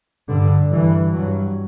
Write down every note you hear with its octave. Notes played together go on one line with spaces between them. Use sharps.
G2 D3
G2 E3
G2 F#3